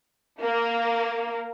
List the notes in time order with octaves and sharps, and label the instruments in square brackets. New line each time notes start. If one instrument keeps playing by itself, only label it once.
[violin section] A#3